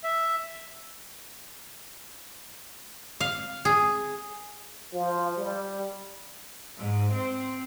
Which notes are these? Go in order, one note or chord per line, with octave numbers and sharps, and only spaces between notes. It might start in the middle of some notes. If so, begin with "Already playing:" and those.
E5
F5
G#4
F3
G3
G#2
C4